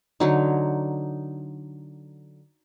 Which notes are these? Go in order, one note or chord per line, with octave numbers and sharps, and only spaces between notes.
D3 F#3 D#4